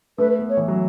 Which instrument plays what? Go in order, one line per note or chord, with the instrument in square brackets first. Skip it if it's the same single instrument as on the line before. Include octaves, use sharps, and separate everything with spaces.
[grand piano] A3 [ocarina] B4
[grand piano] B3
[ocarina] C#5
[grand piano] E3
F#3